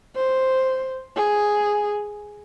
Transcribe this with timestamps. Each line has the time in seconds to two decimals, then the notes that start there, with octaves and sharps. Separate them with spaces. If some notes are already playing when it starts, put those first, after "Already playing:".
0.15 C5
1.16 G#4